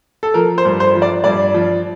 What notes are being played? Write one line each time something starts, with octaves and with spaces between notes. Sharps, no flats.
A4
F3 A#4
C5
G2
C5
F3
D5
G2 D5
F3